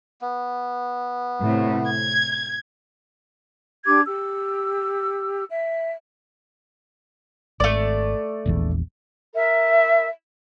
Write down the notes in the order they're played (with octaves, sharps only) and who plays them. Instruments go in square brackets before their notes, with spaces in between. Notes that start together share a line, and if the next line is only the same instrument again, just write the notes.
[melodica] B3
[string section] A2 C3
G#6
[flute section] D4 G4 D6 G#6
G4 E6
E5
[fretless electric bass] G#1 [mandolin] A3 D5
[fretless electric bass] E1 A#1 E2
[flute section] A#4 E5